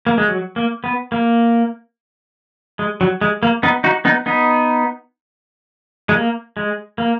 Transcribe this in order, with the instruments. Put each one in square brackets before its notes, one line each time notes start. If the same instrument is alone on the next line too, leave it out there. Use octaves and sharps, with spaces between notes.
[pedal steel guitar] A#3
G#3
F#3
A#3
B3
A#3
G#3
F#3
G#3
A#3
B3 D#4
D#4 F#4
B3 D#4
B3 D#4
G#3
A#3
G#3
A#3